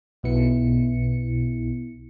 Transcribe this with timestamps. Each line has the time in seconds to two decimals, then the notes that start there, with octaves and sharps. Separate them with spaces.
0.23 B1 B2 B3 E4 C#7